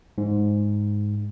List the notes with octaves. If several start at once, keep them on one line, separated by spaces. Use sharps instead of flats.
G#2